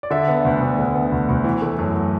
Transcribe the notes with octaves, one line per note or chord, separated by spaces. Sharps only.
D5
D3 E5
B3
D2
D2
D3
B3
D2
D2
E3
A3
F#2